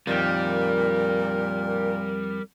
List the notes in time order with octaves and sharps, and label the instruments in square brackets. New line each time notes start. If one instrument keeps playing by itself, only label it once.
[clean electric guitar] F2 D#3 [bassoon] A#2 [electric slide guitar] G3 [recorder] A#4